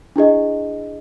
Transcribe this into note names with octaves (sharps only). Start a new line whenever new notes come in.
D4 E4 G#4 D#5